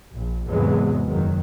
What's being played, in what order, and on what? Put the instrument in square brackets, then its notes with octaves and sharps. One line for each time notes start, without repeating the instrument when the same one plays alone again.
[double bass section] A#1
E2 G#2 C3 F#3 G#3 B3
F#1 D#3 F#3